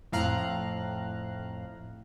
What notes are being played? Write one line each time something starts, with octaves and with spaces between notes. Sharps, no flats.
F2 A2 F5 A#5 F#6